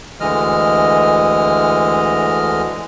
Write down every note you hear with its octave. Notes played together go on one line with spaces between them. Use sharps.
D2 D3 E3 G#3 D#5 F6